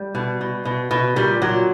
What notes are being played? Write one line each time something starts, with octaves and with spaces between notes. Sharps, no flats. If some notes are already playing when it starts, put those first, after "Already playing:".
Already playing: G3
B2
B2
B2
B2
A#2 G3
A#2 F#3